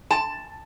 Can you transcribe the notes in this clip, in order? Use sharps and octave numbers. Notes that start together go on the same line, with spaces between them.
A5